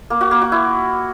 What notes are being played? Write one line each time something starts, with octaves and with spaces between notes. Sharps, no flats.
A#3
F#4
A#3
F#4
E4